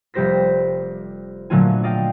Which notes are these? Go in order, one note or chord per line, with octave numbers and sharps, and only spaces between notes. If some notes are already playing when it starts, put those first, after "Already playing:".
F1 G3 G4 C5 A#6 B6
A#2 D3 F#3 A3 F4 G#5
D5 D#5 F5 G5